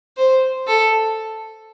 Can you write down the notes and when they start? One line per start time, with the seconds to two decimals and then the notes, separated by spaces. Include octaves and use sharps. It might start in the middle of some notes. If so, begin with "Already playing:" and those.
0.17 C5
0.67 A4